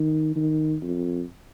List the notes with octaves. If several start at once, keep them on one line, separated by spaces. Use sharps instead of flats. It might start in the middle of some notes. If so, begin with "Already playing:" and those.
Already playing: D#3
D#3
F2